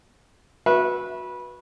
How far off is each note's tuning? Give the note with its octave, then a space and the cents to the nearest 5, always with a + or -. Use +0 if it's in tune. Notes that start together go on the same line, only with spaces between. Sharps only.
F#4 -15 B4 -20 E5 -5